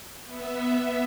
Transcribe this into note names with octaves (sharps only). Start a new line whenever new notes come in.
B3 E5